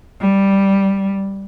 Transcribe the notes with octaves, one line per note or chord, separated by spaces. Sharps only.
G3